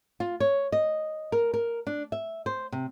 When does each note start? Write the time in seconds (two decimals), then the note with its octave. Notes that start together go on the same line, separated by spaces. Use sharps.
0.20 F4
0.40 C#5
0.72 D#5
1.32 A#4
1.53 A#4
1.87 D4
2.12 E5
2.46 C5
2.72 C3